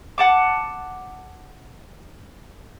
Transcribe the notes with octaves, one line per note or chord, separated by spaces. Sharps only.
F#5 A5 D6